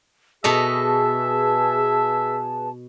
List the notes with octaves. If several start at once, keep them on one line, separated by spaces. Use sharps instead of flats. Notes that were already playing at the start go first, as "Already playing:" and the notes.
B2 G#4 A4 B4 D#5 E5 A5